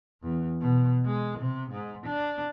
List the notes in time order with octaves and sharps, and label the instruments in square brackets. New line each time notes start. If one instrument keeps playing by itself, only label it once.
[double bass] E2
B2
G#3
C3
G#2
D4